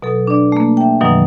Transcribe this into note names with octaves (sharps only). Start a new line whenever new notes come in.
B2 F#3 A4
D4 D5
A3 A#3
E5 G5
F#2 B2 D#3 E3 F#3